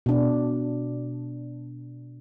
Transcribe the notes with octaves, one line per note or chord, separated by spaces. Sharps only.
B2 D4